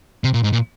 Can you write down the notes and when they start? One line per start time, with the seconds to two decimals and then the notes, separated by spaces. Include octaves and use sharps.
0.24 C3
0.34 A#2
0.43 G#2
0.53 A#2